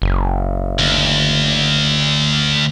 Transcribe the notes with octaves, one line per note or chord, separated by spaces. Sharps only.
F#1
D2